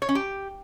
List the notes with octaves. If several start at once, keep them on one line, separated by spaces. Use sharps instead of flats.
C#5
C#4
G4